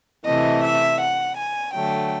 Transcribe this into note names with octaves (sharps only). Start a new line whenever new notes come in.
C3 E3 A3 D#5
E5
F#5
G#5
D3 F#3 A3 G5